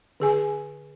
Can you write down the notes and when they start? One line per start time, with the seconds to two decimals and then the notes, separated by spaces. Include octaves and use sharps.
0.20 D3 G#4 G#5